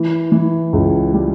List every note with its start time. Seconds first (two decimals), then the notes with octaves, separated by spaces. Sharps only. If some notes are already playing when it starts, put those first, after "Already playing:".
Already playing: E3
0.32 E3
0.73 C#2
1.14 G3